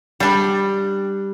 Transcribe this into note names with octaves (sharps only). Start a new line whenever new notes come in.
G3 D4